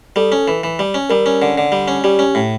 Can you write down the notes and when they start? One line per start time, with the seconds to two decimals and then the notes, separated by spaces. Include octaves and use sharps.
0.16 G3 A4
0.32 C#4
0.48 E3
0.64 E3
0.79 G3
0.94 C#4
1.10 G3 A#4
1.26 C#4
1.42 D3
1.58 D3
1.72 G3
1.88 C#4
2.04 G3 G4
2.19 C#4
2.35 A2